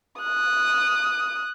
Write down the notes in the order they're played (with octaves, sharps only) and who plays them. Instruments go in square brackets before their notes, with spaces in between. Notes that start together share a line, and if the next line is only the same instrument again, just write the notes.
[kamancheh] D#6 F#6